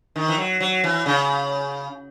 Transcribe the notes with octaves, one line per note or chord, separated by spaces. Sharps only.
D#3
E3
F#3
F#3
E3
C#3